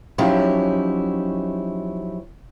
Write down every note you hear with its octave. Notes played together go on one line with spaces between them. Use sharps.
F3 F#3 C#4 D#4 E4 G4